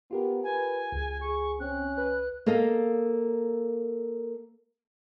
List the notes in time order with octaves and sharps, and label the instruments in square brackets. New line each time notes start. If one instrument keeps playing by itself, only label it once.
[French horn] B3 [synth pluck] F4 G4 A#4
[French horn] B4 [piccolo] G#5
[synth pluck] C#2 [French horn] G#4
[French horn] G#4 [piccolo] C#6
[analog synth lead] C4 [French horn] C#4 [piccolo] F#6
[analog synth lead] B4
[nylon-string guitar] A#3 A4 A#4 D#5 F5